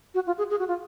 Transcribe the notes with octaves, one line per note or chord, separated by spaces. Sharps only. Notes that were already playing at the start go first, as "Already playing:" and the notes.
F#4
F4
G#4
G#4
F#4
F4